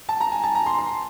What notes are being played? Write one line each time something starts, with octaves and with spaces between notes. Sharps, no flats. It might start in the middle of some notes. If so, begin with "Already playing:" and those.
A5
A#5
G#5
A5
A#5
C6
C6